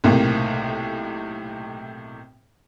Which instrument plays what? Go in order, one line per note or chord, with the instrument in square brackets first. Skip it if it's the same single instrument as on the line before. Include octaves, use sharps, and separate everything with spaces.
[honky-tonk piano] B1 A2 C3 A#3